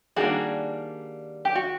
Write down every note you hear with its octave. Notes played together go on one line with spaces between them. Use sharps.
D#3 G3 A#3 D4 F#4 G#4
G4
F#4